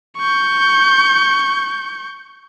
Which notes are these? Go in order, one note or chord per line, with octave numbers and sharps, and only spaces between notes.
C#6 G6